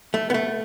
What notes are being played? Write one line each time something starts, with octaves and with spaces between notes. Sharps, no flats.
A3
B3
A3